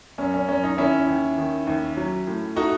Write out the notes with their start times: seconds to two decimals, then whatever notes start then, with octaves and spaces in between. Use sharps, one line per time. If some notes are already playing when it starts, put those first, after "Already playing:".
0.18 F#2 C#4
0.34 C#4
0.48 F#2 C#4
0.64 D#4
0.77 D#2 C#4 E4
1.07 D#2
1.38 D#3
1.67 D#2
1.97 F#3
2.27 A2
2.56 A3 D#4 F#4